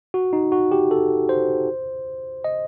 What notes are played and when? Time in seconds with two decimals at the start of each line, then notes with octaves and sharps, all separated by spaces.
0.14 F#4
0.33 D#4
0.52 F#4
0.72 G4
0.91 A4
1.29 C5
2.44 D#5